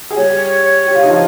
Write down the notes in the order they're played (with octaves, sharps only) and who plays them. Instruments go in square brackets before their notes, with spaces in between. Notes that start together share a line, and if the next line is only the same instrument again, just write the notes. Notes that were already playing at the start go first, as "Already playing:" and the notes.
[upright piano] G#4
[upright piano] G3 G4 [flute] C#5
[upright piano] G4
F4
D#4
F3 F4